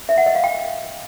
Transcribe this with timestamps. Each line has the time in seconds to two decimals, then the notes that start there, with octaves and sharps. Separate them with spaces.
0.09 E5
0.18 F#5
0.26 D#5
0.35 F5
0.44 G5